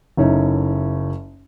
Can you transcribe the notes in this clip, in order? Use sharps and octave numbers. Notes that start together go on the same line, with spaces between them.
F#1 A3 C#4 D#4 E4